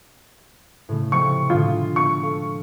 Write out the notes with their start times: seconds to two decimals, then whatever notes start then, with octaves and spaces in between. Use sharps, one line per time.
0.89 A2 C#3 A3
1.12 C3 F3 A4 C#6
1.50 A2 D3 G#3 F4
1.96 C#6
2.23 A4 F5